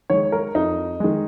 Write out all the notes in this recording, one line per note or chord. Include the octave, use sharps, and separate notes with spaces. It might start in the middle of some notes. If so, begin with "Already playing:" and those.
D#3 G#3 C#5
A#4
F2 D#4
D#3 G#3